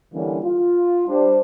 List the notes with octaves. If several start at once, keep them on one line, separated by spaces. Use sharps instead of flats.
D3 E3 G3 A#3 C#4
F4
G3 D4 C5